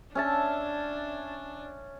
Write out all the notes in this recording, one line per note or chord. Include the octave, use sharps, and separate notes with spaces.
C#4 D4 E5 A5